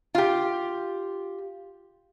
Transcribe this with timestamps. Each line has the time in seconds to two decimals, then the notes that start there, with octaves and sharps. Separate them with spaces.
0.15 F4 G4